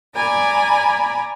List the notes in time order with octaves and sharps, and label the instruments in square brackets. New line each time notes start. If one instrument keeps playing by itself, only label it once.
[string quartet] D5 G#5 A#5 B5